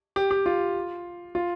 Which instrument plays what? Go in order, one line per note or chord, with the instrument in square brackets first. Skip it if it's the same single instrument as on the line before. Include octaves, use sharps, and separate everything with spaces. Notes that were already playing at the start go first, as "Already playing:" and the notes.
[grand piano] G4
G4
F4
F4